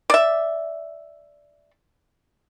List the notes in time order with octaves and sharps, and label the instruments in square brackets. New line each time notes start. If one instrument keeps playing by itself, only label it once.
[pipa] D5 E5